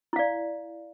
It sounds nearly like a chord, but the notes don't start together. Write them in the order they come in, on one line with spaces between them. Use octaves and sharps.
E4 F5 D5